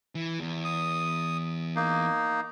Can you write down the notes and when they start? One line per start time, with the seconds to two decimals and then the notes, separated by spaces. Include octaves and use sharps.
0.15 E3
0.39 E2
0.65 D#6
1.76 A#3 D#4